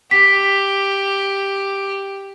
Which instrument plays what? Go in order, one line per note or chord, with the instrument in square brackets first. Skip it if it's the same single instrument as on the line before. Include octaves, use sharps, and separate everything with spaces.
[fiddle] G4 [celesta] B6